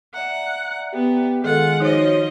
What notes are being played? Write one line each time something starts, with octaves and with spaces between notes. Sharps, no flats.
D5 E5 F#5 A#5
B3 G4
D#3 G#3 F4 A4 F#5
F3 D#4 F#4 C5 C#5 D#5